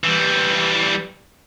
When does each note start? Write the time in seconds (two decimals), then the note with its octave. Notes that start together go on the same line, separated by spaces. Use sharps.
0.04 E3 G3